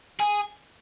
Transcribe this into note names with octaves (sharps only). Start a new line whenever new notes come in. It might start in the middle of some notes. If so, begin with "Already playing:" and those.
G#4